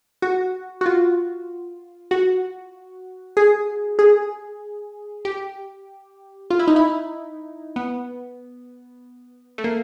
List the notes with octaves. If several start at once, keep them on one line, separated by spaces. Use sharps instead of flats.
F#4
F#4
F4
F#4
G#4
G#4
G4
F4
E4
D#4
E4
B3
A3
A#3